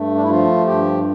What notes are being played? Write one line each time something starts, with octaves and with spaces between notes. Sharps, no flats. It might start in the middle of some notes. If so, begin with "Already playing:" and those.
Already playing: G2 A3
D4
E4
F3 F4
G2 G4